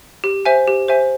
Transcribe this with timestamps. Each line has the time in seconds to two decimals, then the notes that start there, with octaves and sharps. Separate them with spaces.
0.24 G4
0.45 C5 E5 G#5
0.67 G4
0.88 C5 E5 G#5